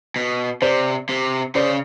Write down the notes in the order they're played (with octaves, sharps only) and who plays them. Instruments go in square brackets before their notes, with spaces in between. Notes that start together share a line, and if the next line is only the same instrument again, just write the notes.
[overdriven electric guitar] B2
[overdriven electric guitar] C3 [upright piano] C5 D5
[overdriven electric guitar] C3
[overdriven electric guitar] C#3 [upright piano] C5 D5